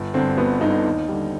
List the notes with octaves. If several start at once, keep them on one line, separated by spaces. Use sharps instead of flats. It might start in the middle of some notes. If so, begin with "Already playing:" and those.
Already playing: G1
G2 D3 C4
G1 B3
G2 D3 D#4
D#2
D3 G3